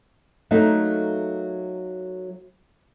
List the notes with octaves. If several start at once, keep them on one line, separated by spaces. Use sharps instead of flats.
F#3 A3 A#3 D#4